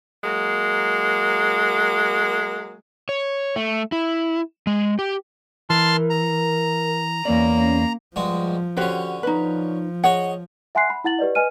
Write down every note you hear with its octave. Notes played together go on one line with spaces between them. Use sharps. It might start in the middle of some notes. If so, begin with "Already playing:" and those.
F#3 G#3 A#3
C#5
A3
E4
G#3
G4
E3 A#4 A5 C6 F6
A#5
E2 A#3 C#4 D5
G2 F3 G#3 F#4
D3 C#4 F#4 G4 C5
F3 D#4 B4
G#4 C#5 D#5 F#5
E5 F#5 G#5 C6 F#6 C7
B5
E4 F#5 A6 F#7
G4 B4 D5 D#5
B4 D#5 G#5 F6 D#7